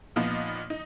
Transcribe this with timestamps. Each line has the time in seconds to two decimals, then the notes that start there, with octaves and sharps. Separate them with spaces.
0.16 A#2 F3 B3 D#4
0.70 D#4